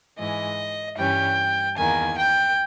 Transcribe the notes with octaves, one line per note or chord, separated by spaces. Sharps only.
G#2 E3 G#3 D#5
G2 E3 G3 C#4 G5
E2 D#3 A#3 G#5
G5